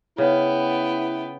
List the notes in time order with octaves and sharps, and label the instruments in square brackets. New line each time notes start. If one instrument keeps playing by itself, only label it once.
[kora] C#3 [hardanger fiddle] B3 G5 [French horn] E4